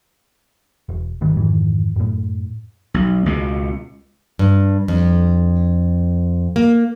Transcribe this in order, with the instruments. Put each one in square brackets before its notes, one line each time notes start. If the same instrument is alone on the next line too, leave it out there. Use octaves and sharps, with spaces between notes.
[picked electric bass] E1
G1 G2 D#3 G3
F2 G#2 D#3 E3
F#2 A2
[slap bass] B1
C#2 B2
[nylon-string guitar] G2
F2
A#3